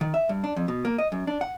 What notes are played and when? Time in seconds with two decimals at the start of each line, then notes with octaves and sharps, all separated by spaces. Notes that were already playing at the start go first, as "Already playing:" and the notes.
0.01 D#3
0.14 E5
0.29 G2
0.44 D4
0.56 F2
0.68 B2
0.85 A#3
0.98 D#5
1.12 F#2
1.27 D4
1.41 F#5